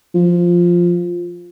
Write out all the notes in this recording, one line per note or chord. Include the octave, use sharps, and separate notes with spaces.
F3